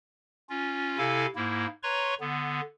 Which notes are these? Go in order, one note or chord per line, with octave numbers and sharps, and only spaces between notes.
C#4 F4
C3 E4 A4 F5 G#5
G#2 A#3 E4
B4 C#5 A#5 C6 C#6
D3 B3